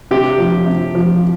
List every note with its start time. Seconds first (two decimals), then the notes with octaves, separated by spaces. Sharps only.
0.11 C3 G4
0.38 F3
0.66 C3
0.95 F3